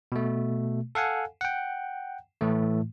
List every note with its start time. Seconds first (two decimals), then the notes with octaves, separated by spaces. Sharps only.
0.12 B2 A3
0.95 A4 F5 F#5 G#5
1.41 F#5 G5
2.41 A2 E3 A3